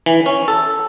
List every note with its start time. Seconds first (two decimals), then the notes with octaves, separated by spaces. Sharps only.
0.06 E3
0.26 C#4
0.48 A4